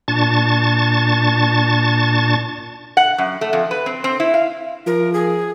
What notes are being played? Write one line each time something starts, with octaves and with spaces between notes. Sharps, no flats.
A#2 D4 A5 C#6 A6
F#5
F#2
A3
F2
B4
C4
C4
E4
F5
F3 A#4
G#4